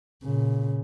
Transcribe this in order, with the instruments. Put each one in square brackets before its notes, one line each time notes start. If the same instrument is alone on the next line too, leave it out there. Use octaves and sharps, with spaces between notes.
[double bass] A#2 C#3